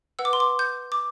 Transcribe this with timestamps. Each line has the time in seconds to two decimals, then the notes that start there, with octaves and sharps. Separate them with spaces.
0.19 B4 F#5 E6
0.25 D6
0.33 C6
0.40 D6
0.59 G6
0.92 D6